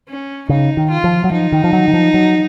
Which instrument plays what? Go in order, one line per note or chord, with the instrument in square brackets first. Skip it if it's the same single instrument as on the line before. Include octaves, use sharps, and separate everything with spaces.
[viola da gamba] C#4
[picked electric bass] C#3 [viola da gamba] D#4
[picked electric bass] D#3
[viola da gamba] F4
[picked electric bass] F3
F#3
[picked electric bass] F3 [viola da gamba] D#4
[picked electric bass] D#3
F3
F#3
D#3
F3
F#3